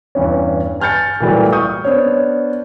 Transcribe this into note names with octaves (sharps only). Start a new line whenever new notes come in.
E2 G2 C#4
G#5 F6 G6 A6 C#7
A#2 E3 F#3 G3 A3
C#6 D#6 G6
B3 D4 C5 C#5